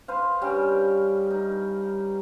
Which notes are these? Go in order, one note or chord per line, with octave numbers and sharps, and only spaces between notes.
B4 C5 F5
G2 G3 C#4 G5
D#4